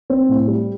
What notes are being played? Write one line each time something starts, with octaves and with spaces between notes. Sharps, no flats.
C4
A2
G3